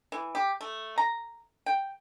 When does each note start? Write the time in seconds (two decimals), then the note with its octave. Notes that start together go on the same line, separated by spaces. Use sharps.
0.12 E3
0.35 G4
0.61 A3
0.98 A#5
1.66 G5